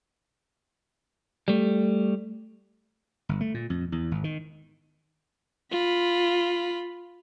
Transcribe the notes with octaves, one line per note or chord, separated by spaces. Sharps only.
G3 A3
G1
A3
A#2
F2
E2
G#1
D#3
F4 B5